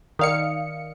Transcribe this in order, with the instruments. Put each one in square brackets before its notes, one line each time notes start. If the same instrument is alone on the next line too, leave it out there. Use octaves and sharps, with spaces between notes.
[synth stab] D#3 F5 C#7 [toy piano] D5 D#6